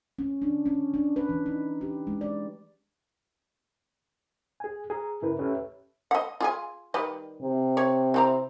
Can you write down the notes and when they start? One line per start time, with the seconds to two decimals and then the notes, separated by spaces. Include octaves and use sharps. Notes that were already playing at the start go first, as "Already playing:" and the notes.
0.19 C#4
0.42 D4
0.66 C#4
0.94 D4
1.16 B4
1.29 E3
1.46 D#4
1.81 G4
2.07 G#3
2.21 D5
4.60 G#4 G#5
4.90 G#4 A#5
5.22 G2 C#3 E4 A#4 B4
5.39 C#4 G4 A4 B4 C#5 E5
6.11 D#5 F#5
6.40 F4 G#4 G#5
6.94 D#3 G3 B4
7.42 C3
7.77 C#5
8.14 E3 C4 A#5